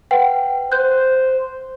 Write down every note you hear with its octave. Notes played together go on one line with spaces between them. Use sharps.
B4 F#5 G5
C5 F#6 G6